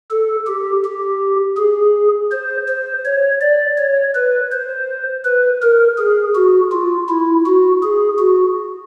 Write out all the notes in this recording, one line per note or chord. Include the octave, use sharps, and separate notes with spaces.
A4
G4
G4
G#4
C5
C5
C#5
D5
C#5
B4
C5
B4
A#4
G#4
F#4
F4
E4
F#4
G#4
F#4